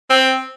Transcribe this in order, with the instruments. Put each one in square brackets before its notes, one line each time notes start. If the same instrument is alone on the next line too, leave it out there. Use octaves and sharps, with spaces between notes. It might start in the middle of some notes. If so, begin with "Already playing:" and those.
[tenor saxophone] C4